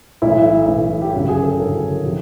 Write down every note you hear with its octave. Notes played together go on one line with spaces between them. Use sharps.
B1 A2 E3 E4
B1 A2 E3
G4
G1 F#2 C#3 F#3 F#4
G#4
A4
G1 F#2 C#3 F#3 A#4
C3 F3